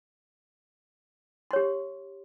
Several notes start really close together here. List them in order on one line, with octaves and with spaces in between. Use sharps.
C6 C#5 G4